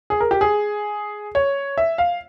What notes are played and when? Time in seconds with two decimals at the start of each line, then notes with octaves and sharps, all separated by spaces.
0.10 G#4
0.20 A#4
0.31 G4
0.41 G#4
1.35 C#5
1.78 E5
1.98 F5